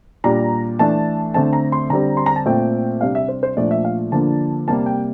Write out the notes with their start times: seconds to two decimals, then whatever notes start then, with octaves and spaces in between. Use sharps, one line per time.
0.24 A#2 G3 D4 A#5
0.79 E3 A3 D4 A5
1.34 D3 A3 C4 A5
1.53 A#5
1.72 C6
1.90 D3 G3 C4 A#5
2.17 C6
2.26 A#5
2.36 A5
2.46 A#2 A3 C4 G5
3.01 C3 G3 D4 F5
3.15 E5
3.28 C5
3.43 C5
3.57 A#2 F3 A3 D4 D5
3.71 E5
3.85 F5
4.12 D3 F3 A#3 D4 A5
4.68 C3 G3 A#3 A5
4.86 G5